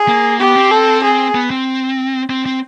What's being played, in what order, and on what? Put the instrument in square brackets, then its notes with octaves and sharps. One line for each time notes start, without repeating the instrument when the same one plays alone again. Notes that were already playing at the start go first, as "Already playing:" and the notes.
Already playing: [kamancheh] G#4
[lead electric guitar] A#3
[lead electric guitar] B3 [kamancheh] G4
[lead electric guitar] C4
[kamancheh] A4
G#4
[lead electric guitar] B3
C4
C4
C4